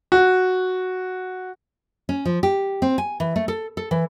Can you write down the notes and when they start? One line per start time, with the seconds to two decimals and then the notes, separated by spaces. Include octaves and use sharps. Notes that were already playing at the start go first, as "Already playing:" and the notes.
0.12 F#4
2.09 C#4
2.25 F3
2.43 G4
2.82 C4
2.98 G#5
3.20 E3
3.36 A3
3.48 A4
3.77 A4
3.91 E3